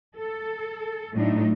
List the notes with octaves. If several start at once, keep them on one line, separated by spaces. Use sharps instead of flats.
A4
A2 F#3 A3 D4 D#4